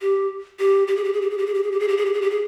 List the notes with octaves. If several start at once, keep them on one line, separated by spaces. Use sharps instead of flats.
G4
G4
G4
G#4
G4
G#4
G4
G#4
G4
G#4
G4
G#4
G4
G#4
G4
G#4
G4
G#4
G4
G#4